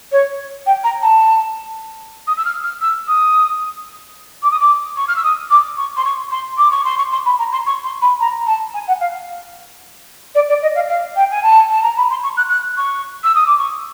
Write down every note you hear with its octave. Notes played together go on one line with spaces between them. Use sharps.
C#5
G5
A#5
A5
D#6
E6
F6
F6
E6
D#6
D6
D#6
D6
C#6
F6
E6
D#6
D6
C#6
C6
C#6
C6
D6
C#6
C6
C#6
C6
B5
A#5
C6
C#6
C6
B5
A#5
A5
G#5
F#5
F5
D5
D5
D#5
F5
F5
G5
G#5
A5
A5
A#5
B5
C6
C#6
F#6
F#6
C#6
E6
D#6
D6
C#6